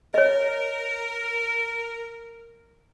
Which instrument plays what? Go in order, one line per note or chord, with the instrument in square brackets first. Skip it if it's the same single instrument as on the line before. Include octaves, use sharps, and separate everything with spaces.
[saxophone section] A#4 [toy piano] C#5 D#5